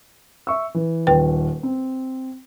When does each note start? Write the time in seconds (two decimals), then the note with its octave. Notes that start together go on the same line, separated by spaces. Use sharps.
0.47 E5 C#6 E6
0.75 E3
1.07 D#1 B4 G5
1.63 C4